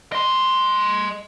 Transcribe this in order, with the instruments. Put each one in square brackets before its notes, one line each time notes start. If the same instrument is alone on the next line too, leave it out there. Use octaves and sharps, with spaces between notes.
[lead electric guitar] D#5 C6